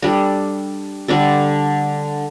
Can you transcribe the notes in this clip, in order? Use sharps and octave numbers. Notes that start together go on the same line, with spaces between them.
G3 D4 A4
D3 G3 D4 A4